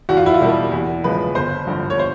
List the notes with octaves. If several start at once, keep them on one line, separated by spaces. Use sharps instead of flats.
E2 F#4
F4
E4
F4
B2 G3 A#3
E2
C#3 F3 G#3 B4
G1 C5
G2 D3 F3
C#5
C5